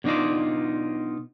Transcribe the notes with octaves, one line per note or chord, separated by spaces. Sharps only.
B2 D4 D#4 F4 D5